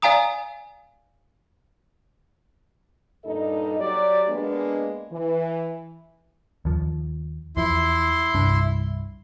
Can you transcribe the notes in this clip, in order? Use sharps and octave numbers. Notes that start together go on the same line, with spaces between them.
D5 F5 G#5 A#5 D#6
G2 A#2 D#4 A4 D#5
F#3 G4 D5
G#3 A#3 B3 D4
E3
D#2 F3
E2 F3 E4 C6
C2 G2 D4